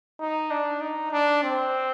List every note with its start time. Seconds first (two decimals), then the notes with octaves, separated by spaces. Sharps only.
0.20 D#4
0.50 D4
0.81 D#4
1.12 D4
1.43 C4